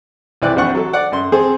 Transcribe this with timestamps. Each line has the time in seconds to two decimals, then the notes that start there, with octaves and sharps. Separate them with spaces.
0.42 C2 E3 D5 F#6
0.56 A#1 C4 D4 F#5 C#6
0.75 F#3 A4
0.93 D5 F#5
1.12 F#2 C6
1.32 C4 G#4 A4 C5